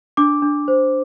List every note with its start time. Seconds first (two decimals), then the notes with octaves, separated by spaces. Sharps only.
0.17 D4 D6
0.42 D4
0.68 C5